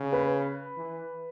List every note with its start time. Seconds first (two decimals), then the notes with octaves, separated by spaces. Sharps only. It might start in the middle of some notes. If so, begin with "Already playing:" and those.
Already playing: C#3
0.13 B4
0.77 E3